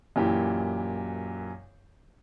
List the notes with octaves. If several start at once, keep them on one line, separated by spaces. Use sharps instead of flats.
F#2 A#2 E3 G4